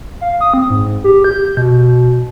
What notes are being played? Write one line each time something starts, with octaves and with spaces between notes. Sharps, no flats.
F5
D#6
C4
G#2
G4
G6
B2